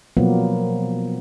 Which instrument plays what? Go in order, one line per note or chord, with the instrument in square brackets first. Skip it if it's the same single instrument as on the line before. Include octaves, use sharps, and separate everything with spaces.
[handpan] B2 F3 F#3 A#3 B3